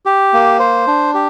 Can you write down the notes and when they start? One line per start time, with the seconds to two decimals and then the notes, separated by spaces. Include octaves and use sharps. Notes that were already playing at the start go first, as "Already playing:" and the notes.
0.06 G4
0.33 A#3
0.59 C5
0.87 D4
1.14 G4